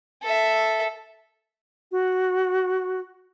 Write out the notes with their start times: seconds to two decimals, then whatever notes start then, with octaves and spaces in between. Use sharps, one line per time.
0.22 A4 E5
1.92 F#4